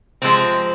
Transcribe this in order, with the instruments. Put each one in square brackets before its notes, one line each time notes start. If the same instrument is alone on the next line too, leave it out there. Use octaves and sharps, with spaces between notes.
[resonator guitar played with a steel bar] C3 F3 G#3 C4